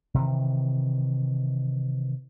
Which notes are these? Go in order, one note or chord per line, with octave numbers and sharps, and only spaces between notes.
C3 D#3 E3